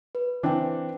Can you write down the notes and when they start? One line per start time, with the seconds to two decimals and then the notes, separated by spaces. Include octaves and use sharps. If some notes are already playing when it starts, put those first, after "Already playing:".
0.15 B4
0.43 E3 C4 D4 G5 D6